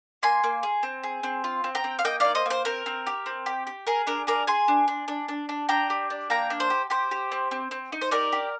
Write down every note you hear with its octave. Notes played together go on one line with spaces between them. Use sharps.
A#3 G#5 C6
A#3
G#4
C4
G#4
C4
F4
C4
G5 A#5
C4
F5
A#3 D#5 G5
D#4 D5 F5
C5 D#5
A#3 C5
C4 A#4
C4
G4
C4
G4
G4
G#4 A#4
D4 A#4
G#4 A#4 D5
G#4 G#5 C6
D4
D4
D4
D4
D4
D4 G5 A#5
G4
D4
A#3 G5 A#5
D4
C5
G4
G4 C5
G4
C4
C4
C4
D#4
C5
G4 A#4 D5
G4